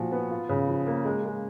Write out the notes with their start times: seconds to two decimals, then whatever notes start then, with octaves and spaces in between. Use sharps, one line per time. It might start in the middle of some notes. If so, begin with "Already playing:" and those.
Already playing: A#2 F3 F#4
0.12 B3
0.31 F4
0.49 C#3
0.68 F3
0.86 A#3
1.05 G#3
1.24 G#3